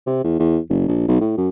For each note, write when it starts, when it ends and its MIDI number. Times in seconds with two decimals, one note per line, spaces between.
0.06 0.20 48
0.24 0.38 40
0.39 0.58 40
0.70 0.87 30
0.88 1.06 34
1.08 1.20 35
1.21 1.35 45
1.37 1.49 42